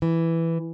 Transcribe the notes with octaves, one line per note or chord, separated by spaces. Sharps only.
E3